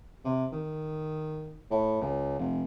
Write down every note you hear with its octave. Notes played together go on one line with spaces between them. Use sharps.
C3
D#3
A2
C#2
F1